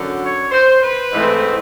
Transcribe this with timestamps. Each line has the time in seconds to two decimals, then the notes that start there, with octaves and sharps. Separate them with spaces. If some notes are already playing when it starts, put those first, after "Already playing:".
Already playing: F#2 D3 F#3
0.21 C#5
0.51 C5
0.82 B4
1.13 G#2 E3 A3 C4